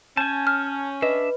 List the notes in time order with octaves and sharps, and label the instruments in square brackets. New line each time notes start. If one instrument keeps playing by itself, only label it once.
[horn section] C#4 [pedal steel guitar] G#5 A5 [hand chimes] G6
[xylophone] F6
[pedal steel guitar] D4 E5 [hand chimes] B4 [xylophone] D#5